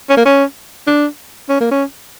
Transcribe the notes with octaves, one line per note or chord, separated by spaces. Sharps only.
C#4
A#3
C#4
D4
C#4
A#3
C#4